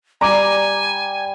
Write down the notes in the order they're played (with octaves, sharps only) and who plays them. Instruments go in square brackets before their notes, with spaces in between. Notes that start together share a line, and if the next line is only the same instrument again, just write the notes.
[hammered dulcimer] G3 [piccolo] G#5 [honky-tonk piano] A#5 D6